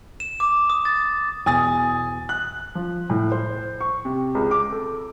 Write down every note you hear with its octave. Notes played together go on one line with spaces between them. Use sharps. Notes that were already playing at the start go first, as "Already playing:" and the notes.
E7
D6
D#6
A6
E2 B2 G#5 D#6 A6
F#6
F3
A2
C5
C#6
C3
C#2
D6
A4